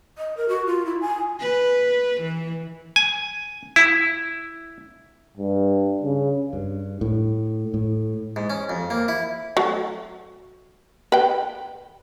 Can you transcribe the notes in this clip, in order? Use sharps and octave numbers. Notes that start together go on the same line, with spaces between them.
D#5
A#4
F#4
F4
E4
G#5
B4
E3
G#5
E4
G2
C#3
G2
A2
A2
G#2
C#4
F2
A#3
E4
F#3 A3
B4 G5